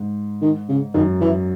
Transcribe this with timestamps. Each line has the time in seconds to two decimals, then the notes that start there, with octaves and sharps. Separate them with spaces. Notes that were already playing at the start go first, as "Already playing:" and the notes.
Already playing: G#2
0.41 D#3
0.69 C#3
0.94 F#2 D#3
1.21 E3